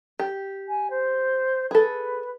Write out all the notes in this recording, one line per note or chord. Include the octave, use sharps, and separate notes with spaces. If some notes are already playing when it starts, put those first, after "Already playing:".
G4
G#5
C5
G#4 A4 B4